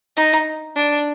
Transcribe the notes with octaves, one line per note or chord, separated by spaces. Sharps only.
D#4
D4